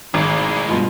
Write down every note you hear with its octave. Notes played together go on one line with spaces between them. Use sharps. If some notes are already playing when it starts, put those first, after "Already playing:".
G#1 A2 G#3
G2 B2 F4